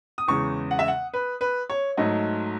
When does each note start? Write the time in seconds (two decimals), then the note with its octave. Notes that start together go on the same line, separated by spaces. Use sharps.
0.18 D#6
0.28 E2 C#3 G#3 C#6
0.71 F#5
0.79 E5
0.88 F#5
1.14 B4
1.41 B4
1.70 C#5
1.97 G#2 F#3 A3 D#5